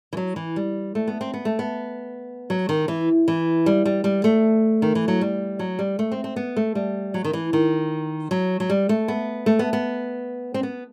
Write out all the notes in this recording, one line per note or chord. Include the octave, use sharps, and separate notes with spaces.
E3
F#3
E3
G3
A3
B3
C4
B3
A3
B3
F#3
D#3
E3
E3
G3
G3
G3
A3
D#3
E3
F#3
G3
F#3
G3
A3
C4
C4
B3
A3
G3
F#3
D#3
E3
D#3
F#3
F#3
G3
A3
B3
A3
B3
B3
C4
B3